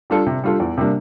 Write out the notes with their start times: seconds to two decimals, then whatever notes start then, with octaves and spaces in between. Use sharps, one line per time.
0.10 G3 D4 F4 A4
0.26 C3
0.44 G3 D4 F4 A4
0.60 E2
0.77 C3 G3 A#3 D4